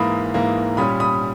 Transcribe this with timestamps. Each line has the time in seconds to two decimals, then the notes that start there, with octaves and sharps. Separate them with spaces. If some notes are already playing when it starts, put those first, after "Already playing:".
Already playing: G#2 E3 A#3 B5 D#6
0.34 G#2 E3 A#3
0.77 A#2 G3 C#4 B5 D#6
1.00 B5 D#6